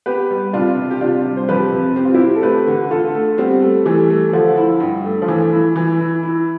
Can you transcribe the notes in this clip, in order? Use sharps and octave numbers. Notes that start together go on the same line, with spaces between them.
B3 G4 B4
G3
C3 D4 F4
C3
G4
C3 D4 F4
G3
C5
F2 G4 B4
C3
C4 G4
F4
E4 G4
C4
A4
A3 G4 B4
D3
D3 F4 A4
A3
G3 B3 C4
A3
E3 G3 A3
A3
D3 F3 A3
E4
G2
A3
F3
E3 A3
E4
E3 B4
E4
E4